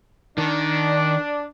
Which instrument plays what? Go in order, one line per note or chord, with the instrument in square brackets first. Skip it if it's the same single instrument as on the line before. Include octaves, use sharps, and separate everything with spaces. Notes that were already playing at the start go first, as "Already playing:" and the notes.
[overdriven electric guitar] D#3 [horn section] D4